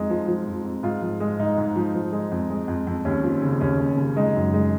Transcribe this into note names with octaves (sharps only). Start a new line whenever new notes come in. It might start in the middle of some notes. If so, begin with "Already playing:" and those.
Already playing: F2 G#3 D#4
F3
F3
F2
F2
G#2 F4
F3
G#3
G#2 D#4
G#2
F3
F3
G#3
F2
G#3
F2
F2
D#2 C#4
F3
C#3
D#2 C#4
D#2
C#3
G#3 D#4
F#2
G#3